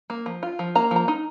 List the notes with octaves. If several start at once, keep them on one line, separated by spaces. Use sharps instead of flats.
A#3
F3
F4
F3
A#3 A#5
F3 A#5
D#4